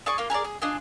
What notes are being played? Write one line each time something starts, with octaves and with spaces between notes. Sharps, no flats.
G#4 D5 G#5 C#6
A#3 F4
G#4 A#4 C#5 D5
G#4
D4 F4 D#5 G#5